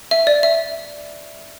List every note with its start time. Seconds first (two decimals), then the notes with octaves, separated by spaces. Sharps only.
0.11 E5
0.27 D5
0.43 E5